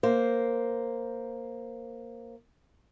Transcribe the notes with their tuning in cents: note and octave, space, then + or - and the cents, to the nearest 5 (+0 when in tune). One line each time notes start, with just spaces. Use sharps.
A#3 +0 C5 +0